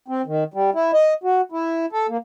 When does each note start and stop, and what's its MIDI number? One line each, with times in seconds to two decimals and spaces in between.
0.08 0.22 60
0.26 0.44 51
0.54 0.70 55
0.75 0.91 64
0.94 1.14 75
1.24 1.41 66
1.52 1.86 64
1.92 2.07 69
2.09 2.17 58